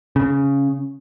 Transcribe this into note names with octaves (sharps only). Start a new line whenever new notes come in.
C#3